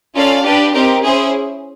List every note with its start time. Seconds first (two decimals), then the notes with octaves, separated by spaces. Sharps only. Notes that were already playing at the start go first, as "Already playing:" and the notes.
0.15 C#4 F4 A4 D5 F5
0.45 D4 G4 B4
0.73 C4 D#4 G4 A#4
1.03 C#4 E4 G#4 C5